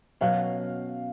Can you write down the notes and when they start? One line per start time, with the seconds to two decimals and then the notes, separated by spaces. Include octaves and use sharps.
0.21 B2 F#3 C#4 F5